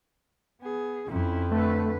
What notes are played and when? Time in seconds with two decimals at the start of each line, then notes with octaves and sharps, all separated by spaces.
0.62 B3 G#4
1.08 F2 C#4 E4
1.52 D3 A3 B4